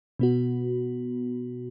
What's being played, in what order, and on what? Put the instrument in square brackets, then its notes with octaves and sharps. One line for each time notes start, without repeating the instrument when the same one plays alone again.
[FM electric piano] B2 B3 F#4